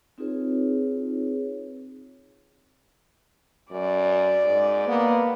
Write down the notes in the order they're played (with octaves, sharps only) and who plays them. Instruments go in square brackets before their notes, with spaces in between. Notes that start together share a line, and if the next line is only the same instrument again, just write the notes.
[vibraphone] C4 D#4 F4 G#4 B4 C#5
[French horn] F#2 [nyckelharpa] D5
[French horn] G#2
[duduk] A#3 [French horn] B3